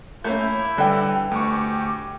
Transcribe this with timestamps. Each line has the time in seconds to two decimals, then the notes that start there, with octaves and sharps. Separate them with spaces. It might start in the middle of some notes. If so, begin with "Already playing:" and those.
0.24 A3 A#3 C#4 E4 G6
0.78 D3 E3 G3 G5
1.31 D2 G4 C#6